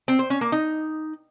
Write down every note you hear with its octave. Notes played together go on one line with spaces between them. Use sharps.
C4
C5
C#4
A#3
D#4